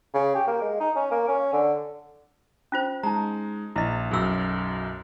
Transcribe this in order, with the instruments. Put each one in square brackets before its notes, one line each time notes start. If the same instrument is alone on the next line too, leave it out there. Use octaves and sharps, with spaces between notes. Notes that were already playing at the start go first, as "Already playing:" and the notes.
[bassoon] C#3
G4
A#3
G#3
D#4
C#4
A#3
C#4
D3
[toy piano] C#4 F4 C5
[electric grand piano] G#3 D#4 [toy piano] A5 A#5
[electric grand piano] A#1 [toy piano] E4 D#5
[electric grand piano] B1 F#2 [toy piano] G#4 E6